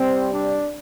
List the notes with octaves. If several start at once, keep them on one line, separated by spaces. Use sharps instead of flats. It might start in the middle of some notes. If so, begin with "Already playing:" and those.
Already playing: C3 G3 C4
D4